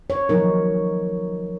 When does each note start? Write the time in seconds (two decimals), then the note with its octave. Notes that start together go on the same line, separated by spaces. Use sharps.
0.10 C#5
0.29 F3 F#3 D#4 A#4